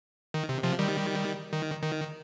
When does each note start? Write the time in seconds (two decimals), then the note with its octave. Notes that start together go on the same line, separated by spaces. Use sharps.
0.34 D#3
0.49 C3
0.63 C3 F3
0.79 D#3 G3
1.53 D#3
1.83 D#3